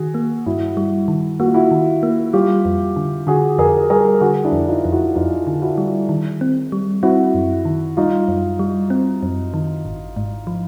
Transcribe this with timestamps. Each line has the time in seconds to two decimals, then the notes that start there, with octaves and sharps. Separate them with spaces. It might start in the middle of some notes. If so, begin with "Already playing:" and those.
Already playing: D#3 F#4 G#4
0.14 A#3
0.46 G2 E4 F#4
0.77 G3
1.08 D#3
1.40 A#3 F#4
1.47 F4
1.54 E4 F#4
1.71 D#3
2.03 A#3
2.33 G3 F4 G4
2.65 F2
2.96 D3
3.27 D3 F#4 G#4
3.58 F2 G#4 A#4
3.90 G3 G#4 A#4
4.21 D3 F#4 G#4
4.44 D4 E4
4.52 F2
4.68 D#4 F4
4.85 F2
4.92 E4 F#4
5.15 F2 D#4 F4
5.47 D3
5.62 E4 F#4
5.78 G3
6.09 D#3
6.41 C4
6.72 G3
7.03 C4 E4 F#4
7.34 F#2
7.65 D#3
7.97 G3 D#4 F4
8.28 F#2
8.59 G3
8.90 C4
9.23 F#2
9.54 D#3
9.85 G#1
10.17 G#2
10.47 F3